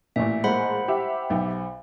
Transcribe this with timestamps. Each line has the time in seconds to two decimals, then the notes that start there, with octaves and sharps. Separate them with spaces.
0.16 A1 A#2 E5
0.44 G#3 A#3 C5 F#5 B5
0.88 G4 E5
1.30 B1